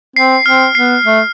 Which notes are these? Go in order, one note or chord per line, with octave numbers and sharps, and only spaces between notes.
C4 C7
C4 F6
B3 C7
A3